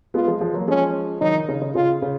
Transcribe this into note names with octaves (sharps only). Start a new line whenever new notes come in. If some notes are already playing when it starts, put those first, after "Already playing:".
G#3 B3 F4
F3 G#3
F3 G#3
F#3 A#3
F3 G#3 C#4
D#3 F#3 D#4
D#3
C#3
C#3
C#3 F4
C#3